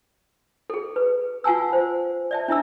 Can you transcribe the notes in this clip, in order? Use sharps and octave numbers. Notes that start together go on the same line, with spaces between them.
G#4 A4
B4
F4 F#5 G#5 A5 E6
C5
D5 E5 A5
D4 E4 E5 E6